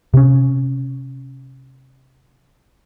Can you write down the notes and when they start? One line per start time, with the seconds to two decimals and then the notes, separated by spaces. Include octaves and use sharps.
0.14 C3 C#4